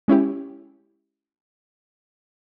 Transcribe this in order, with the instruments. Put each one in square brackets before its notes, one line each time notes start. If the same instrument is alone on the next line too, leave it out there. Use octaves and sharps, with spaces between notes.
[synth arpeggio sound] G#3 C#4 E4 G4